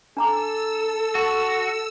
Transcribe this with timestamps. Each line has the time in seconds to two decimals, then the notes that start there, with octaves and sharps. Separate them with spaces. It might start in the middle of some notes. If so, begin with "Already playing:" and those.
0.17 D4 A4 A#5 D6 E6
1.15 F#4